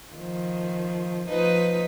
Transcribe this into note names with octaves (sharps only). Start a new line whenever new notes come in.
D#3 F3
F3 D#4 B4